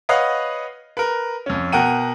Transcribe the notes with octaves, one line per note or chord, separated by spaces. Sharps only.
B4 C#5 D#5 F5 F#5
A#4 B4
F2 C#4
B2 A#4 F#5 G5 D#7